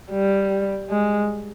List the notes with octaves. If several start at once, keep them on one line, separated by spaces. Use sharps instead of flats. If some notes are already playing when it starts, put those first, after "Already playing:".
G3
G#3